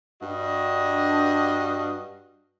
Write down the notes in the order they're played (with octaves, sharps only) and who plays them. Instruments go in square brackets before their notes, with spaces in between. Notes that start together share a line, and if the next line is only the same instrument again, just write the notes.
[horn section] G2 D4 F#4 D#5